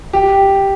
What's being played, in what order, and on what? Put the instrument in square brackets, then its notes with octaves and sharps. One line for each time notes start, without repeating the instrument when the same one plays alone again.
[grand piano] G4